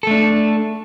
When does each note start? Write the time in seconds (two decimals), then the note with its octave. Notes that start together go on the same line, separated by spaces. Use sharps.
0.03 A4
0.07 A3
0.11 D4